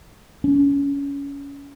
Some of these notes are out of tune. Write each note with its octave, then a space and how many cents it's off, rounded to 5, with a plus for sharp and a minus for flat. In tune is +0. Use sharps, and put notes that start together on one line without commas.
C#4 +25